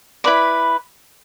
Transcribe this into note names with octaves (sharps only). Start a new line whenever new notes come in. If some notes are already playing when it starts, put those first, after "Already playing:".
E4 B4 D5 B5